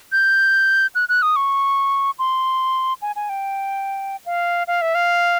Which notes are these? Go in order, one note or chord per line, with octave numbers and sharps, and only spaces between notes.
G6
F#6
F#6
D#6
C#6
C6
G#5
G#5
G5
F5
F5
E5
F5